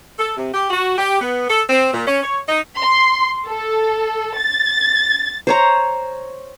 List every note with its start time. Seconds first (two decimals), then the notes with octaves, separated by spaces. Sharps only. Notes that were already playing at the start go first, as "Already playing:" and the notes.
0.18 A4
0.35 C3
0.53 G4
0.70 F#4
0.97 G4
1.21 B3
1.48 A4
1.68 C4
1.94 A#2
2.06 C#4
2.22 C#5
2.47 D#4
2.80 C6
3.47 A4
4.37 A6
5.47 C5 C#5 A#5